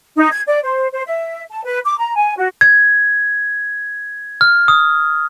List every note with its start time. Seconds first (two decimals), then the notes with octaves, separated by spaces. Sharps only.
0.17 D#4
0.32 G#6
0.47 D5
0.64 C5
0.93 C5
1.07 E5
1.49 A5
1.65 B4
1.85 D6
1.98 A#5
2.16 G#5
2.37 F#4
2.61 G#6
4.41 F6
4.68 D#6